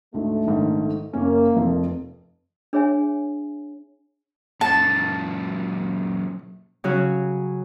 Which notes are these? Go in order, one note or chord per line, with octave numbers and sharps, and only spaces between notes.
D2 G#2 A3
A#1 G#2 D#3
F#1 A#3 C#4
F1 F2 F3
D4 G#4 C#5 E5 G#5
F#2 A#2 A5
C#3 F#3 C#4 F#4